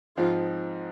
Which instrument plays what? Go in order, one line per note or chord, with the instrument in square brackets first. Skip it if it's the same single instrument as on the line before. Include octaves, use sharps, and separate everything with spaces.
[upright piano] G#2 F3 C4 D#4 [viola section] F4